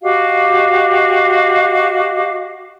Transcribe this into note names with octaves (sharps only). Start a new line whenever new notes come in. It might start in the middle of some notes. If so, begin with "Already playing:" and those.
F#4 G4 D#5 F5